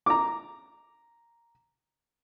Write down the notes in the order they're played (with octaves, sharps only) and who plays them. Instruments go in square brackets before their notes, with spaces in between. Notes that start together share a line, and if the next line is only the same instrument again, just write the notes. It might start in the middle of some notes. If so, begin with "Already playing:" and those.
[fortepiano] A#5 D6